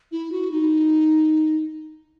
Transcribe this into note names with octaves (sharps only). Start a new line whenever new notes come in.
E4
F#4
D#4